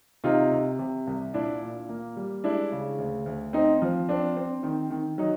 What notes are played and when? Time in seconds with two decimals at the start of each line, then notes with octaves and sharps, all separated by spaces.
0.24 C3 D#4 F4
0.52 C3
0.79 C3
1.07 C2
1.34 A#2 D4 E4
1.62 A#2
1.89 A#3
2.16 G3
2.44 G#3 D4 E4
2.72 C#3
2.98 D2
3.26 D2
3.53 C4 D#4
3.82 F3
4.09 C4 D4
4.37 C4
4.63 D#3
4.91 D#3
5.18 F#3 D#4